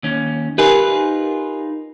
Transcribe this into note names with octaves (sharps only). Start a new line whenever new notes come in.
D#2 C#4
D#4 F4 G4 A#4 B4 G#5